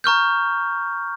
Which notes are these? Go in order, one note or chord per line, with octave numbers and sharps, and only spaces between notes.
A#5 C#6 F6 G6